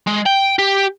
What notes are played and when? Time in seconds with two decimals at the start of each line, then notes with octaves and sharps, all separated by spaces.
0.07 G#3
0.26 G5
0.59 G4